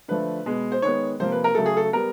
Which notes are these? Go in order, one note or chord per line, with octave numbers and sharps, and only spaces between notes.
D3 F3 A3 B4
B2 G#3 B3
C5
D#3 G#3 B3 C#5
C3 F3 A#3 C5
B4
A#4
C#3 F#3 A3 A4
G#4
A4
G3 B3 A#4